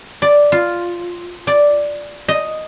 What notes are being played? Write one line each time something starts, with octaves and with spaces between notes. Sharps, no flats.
D5
F4
D5
D#5